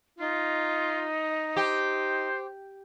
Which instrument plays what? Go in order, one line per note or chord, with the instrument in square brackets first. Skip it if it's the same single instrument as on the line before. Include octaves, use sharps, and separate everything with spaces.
[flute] D#4 [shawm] F4
[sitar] G4 [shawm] C5